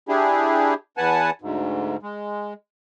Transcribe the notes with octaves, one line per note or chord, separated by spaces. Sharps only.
D4 E4 G4 G#4
E2 B4 F#5 G#5 A5
D2 G#2
G#3